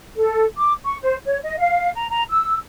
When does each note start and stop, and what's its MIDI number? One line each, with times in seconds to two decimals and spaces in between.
0.16 0.45 69
0.57 0.74 86
0.85 0.96 85
1.02 1.17 72
1.25 1.38 73
1.43 1.55 75
1.59 1.91 77
1.95 2.08 82
2.09 2.24 82
2.29 2.57 88